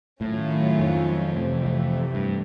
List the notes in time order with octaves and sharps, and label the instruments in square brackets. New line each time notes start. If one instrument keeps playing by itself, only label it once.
[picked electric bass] A2 [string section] D#3 F#3 A3 C#4 F4
[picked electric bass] F2
[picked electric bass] F2 [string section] C3 E3 A3
[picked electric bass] F2
G2